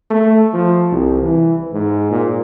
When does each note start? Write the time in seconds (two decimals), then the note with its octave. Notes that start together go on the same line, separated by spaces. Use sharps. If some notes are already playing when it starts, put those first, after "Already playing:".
0.10 A3
0.54 F3
0.92 C2
1.22 E3
1.73 G#2
2.11 A#2